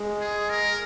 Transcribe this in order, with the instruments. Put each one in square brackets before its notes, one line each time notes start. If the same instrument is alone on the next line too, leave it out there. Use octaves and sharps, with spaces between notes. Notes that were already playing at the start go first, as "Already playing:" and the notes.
Already playing: [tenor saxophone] G#3
[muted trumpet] G#4
A#4